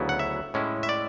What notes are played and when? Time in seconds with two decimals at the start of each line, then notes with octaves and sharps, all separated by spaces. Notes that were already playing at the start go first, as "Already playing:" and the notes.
Already playing: D2 C#3 F#3 B3 E4
0.09 F#5
0.19 E5
0.54 A2 G#3 C#4 E4
0.83 E5
0.89 D5